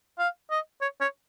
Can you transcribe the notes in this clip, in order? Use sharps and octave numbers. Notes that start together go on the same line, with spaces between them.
F5
D#5
C#5
C#5